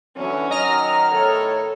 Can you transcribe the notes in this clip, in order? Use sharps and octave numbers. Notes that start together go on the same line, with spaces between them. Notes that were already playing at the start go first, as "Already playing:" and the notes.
D3 E3 F#3 C#4
D#3 F#3 D#5 A#5 F6
A2 D#3 A4 C#5